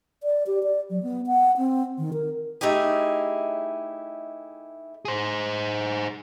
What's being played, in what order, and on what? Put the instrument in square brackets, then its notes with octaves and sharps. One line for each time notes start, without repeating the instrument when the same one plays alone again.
[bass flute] D5
G4
D5
F#3
B3
F#5
C4
D#3
A#4
[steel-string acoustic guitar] A3 D#4 E4 G4 G#4
[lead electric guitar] G#4 C5